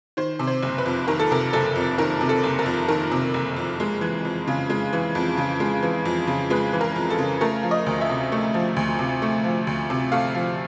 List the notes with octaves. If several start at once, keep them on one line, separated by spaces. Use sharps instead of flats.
D#3 C5
C3
C5
F#1
B4
F2
D#3 A#4
A4
C3 A#4
F#1 A4
F2
D#3 A#4
C3
A4
F#1
A#4
F2
D#3 A#4
C3
F#1
F2
G#3
E3
F2
C#3
G#3
E3
F2
C#3
G#3
E3
F2
C#3
G#3 B4
E3
A#4
F2
A4
C#3
A3 A#4
F3
D#5
D2
E5
C3
A3
F3
D2
C3
A3
F3
D2
C3
A3 F5
F3